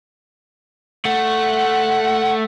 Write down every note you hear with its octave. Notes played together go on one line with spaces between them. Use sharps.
A3 F#5